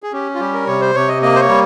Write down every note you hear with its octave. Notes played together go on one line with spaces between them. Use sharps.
G#4
C#4 G4
F4
G3 G4
A#4
C3 C#5
C5
C3 C#5
D#5
A#3 D#5
C5
C#5
G3